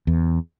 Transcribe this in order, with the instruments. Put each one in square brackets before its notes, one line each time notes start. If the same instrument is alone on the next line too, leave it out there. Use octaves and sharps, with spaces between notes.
[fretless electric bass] E2